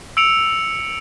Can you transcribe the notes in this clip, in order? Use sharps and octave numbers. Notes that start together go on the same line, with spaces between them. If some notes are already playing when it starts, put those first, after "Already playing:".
E6 C#7 D7 F7